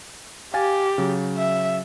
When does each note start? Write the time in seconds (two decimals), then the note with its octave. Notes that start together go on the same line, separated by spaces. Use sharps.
0.54 G4 F5 G#5 A6
0.98 C#3 F#3
1.37 E5